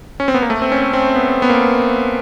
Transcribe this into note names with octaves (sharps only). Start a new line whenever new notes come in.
C#4
C4
B3
A#3
A3
C4
C#4
C4
B3
B3
A#3